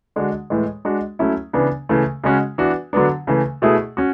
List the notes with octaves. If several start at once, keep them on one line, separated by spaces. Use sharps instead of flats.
D3 G#3 D4 F#4
A2 E3 G#3
G#3 D4 F#4
F#3 A3 C#4 E4
C#3 E3 B3 D4
C#3 E3 A3
C#3 G#3 C#4 F#4
E3 B3 D4 F#4
D3 F#3 B3 D4
C#3 E3 A3
B2 A3 E4 G#4
C#4 F#4